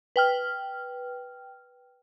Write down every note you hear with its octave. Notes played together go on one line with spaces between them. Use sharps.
B4 G5 F6